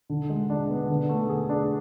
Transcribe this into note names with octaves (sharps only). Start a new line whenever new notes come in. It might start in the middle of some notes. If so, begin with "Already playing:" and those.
D3
G#3
D4
B3
D3
A3
G#4
D4